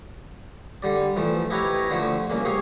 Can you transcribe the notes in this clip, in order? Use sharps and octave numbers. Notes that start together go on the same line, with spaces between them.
D3 G3 D5
E3 F3 A3
D#4 E4 G4 B4 C#5 A#5
D3 F3 A3
C2 C#3 A#3
G4 G#4 C#5 F5